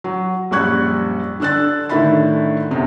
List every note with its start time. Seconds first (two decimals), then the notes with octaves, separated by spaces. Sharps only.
0.04 F#3
0.51 A#1 F#2 G3 C#6 F#6 G#6
1.40 D3 D4 E6 F#6 A6
1.89 A2 D3 D#3 E5 B5 A6
2.71 B1 F#2 C3